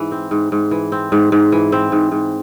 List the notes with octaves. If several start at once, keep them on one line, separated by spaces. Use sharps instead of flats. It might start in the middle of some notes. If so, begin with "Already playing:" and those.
Already playing: G#2 E3
C4
G#2
G#2
E3
C4
G#2
G#2
E3
C4
G#2
G#2